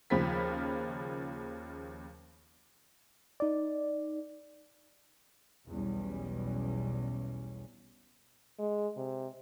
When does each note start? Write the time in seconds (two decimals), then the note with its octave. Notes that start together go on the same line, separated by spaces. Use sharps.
0.10 D#2 C#3 F3 B5 B6
3.40 D#4 D5
5.71 B1 E2 B2 G3 C#4
8.59 G#3
8.97 C3